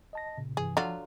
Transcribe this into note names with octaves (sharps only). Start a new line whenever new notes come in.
D#5 A5 A#6
A#2 C#3
G2 C3 E3 G#4
D3 F3 F#3 F4